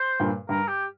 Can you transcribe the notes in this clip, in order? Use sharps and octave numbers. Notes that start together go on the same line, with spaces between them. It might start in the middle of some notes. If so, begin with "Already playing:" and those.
Already playing: C5
G2 A#2
G2 A#4
G4